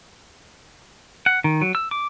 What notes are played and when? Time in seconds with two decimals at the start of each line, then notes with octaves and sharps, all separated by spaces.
1.26 F#5
1.44 D#3
1.61 F#3
1.75 E6
1.91 D6